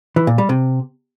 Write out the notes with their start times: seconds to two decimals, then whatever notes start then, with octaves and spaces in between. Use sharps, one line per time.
0.16 E3
0.27 A#2
0.38 G3
0.49 C3